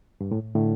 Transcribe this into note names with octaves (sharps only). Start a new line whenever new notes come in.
G2
A2
A2 D3